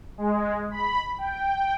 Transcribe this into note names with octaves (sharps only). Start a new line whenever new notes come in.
G#3
B5
G5